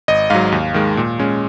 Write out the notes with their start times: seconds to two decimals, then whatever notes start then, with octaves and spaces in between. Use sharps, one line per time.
0.08 G#1 D#5
0.30 G#2 F#3 F5
0.52 D#2
0.74 D#3 G#3
0.97 A#2
1.19 G#3 C#4